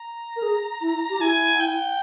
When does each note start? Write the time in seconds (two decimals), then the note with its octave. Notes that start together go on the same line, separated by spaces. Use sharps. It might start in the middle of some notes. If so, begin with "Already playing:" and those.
Already playing: A#5
0.36 A#4
0.42 G#4
0.81 E4
1.10 G4
1.20 E4 G#5
1.61 G5